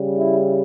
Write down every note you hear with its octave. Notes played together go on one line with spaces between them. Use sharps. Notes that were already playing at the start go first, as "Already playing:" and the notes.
Already playing: C#3 G3
E4